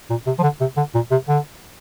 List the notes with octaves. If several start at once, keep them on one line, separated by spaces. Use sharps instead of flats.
A#2
C3
F3
D3
C3
D3
A#2
C3
D3